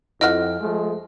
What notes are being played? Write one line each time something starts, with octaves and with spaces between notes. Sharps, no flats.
F2 E4 D#5 F#5 F6
F3 G#3 A3